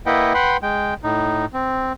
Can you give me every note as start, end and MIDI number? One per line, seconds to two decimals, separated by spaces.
0.06 0.33 58
0.06 0.33 64
0.06 0.33 71
0.06 0.33 75
0.06 0.33 78
0.06 0.33 79
0.34 0.57 71
0.34 0.57 78
0.34 0.57 79
0.34 0.57 83
0.34 0.57 84
0.63 0.94 56
0.63 0.94 79
1.04 1.46 45
1.04 1.46 63
1.54 1.93 60